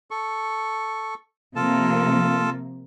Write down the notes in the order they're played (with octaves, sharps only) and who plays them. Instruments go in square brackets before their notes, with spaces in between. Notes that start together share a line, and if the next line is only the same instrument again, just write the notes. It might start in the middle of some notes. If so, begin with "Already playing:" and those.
[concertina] A4 C#6
[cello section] C3 F3 A#3 [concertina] F4 A4 A5